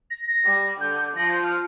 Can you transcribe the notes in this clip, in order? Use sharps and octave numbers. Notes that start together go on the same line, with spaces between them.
A#6
A#6
G3
D3 G6
F3 A#6
G6
F6